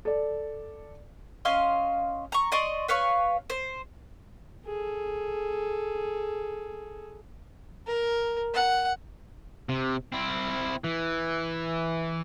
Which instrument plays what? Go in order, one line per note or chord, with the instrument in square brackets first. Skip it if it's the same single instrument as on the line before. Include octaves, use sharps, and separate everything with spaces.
[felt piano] A4 D5
[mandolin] C#4 D#5 F5 C6
A#5 C#6
D5 D#5 C6 C#6
B4 C#5 F5 C#6
C5
[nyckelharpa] G#4 A4
[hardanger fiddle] A#4
F#5
[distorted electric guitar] C3
C4 E4
E3